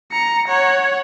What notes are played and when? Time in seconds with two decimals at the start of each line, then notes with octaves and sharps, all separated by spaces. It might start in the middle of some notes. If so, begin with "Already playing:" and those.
0.12 A#5 C#7
0.48 C#5 F#5